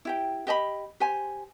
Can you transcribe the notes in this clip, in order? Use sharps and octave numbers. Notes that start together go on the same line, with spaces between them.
E4 G4 G5
G4 D#5 A5 B5
G4 C5 G#5